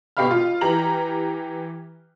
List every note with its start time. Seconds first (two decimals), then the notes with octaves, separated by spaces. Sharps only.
0.17 B2 G4 F5 B5 F6
0.31 F4
0.61 E3 G4 A#5 F#7